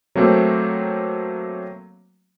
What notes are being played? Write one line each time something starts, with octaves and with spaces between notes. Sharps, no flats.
F#3 A3 A#3 C4